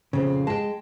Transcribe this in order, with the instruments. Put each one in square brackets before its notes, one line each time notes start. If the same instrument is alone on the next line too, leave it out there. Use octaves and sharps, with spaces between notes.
[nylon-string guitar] F2 A#2 C4 [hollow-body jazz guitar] C#3
[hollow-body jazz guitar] G#3 [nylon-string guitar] G5 A5